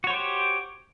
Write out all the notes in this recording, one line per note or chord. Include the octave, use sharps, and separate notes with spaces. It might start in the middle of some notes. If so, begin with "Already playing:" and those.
F#4 G4 C5 C#5